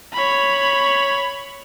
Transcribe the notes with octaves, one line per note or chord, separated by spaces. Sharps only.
C#5 B5